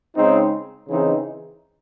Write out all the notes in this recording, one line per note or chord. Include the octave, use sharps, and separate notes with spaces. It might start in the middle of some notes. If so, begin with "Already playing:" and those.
C#3 G#3 C4 D#4
C#3 E3 C4 D#4 G#4